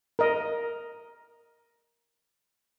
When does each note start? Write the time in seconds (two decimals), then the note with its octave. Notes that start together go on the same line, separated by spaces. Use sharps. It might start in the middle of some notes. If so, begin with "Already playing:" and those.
0.19 A#4 D#5